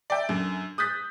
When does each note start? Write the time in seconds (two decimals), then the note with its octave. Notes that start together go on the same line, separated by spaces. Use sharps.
0.10 D5 E5 G5
0.29 F#2 D3
0.78 D#6 F#6 G6 A6 B6